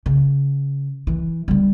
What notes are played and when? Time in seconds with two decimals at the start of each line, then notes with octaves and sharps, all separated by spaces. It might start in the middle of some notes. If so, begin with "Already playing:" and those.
0.06 C#3
1.07 E3
1.48 D3 G3